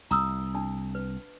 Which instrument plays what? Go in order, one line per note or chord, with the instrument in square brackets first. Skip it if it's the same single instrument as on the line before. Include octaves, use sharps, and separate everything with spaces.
[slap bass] C2 [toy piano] A#5 D#6 E6
[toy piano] D4 A5
B4